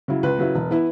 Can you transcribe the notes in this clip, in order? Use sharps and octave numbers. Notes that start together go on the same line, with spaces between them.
C#3 F#3 E4
C#2 B4
C#3 F#3 E4
E1
E3 B3 E4